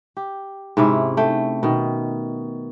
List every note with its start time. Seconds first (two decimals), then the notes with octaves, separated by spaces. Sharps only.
0.17 G4
0.77 G#2 C3 C#4 E4
1.17 A3 G5
1.63 B2 D#3